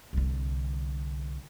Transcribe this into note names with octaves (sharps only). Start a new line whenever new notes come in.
C2 D3